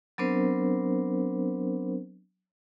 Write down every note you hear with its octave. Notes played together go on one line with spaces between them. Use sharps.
F#3 B3 C4 D4 A#4 C5